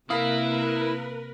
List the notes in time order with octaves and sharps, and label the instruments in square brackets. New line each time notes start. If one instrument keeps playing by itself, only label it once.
[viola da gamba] C3 A#3 [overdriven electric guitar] E4 [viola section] A#4 B4 [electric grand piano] E5 F5 D#6